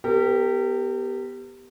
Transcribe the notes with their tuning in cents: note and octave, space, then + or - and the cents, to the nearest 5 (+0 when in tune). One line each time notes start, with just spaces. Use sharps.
B3 +5 G4 +0 A#4 -40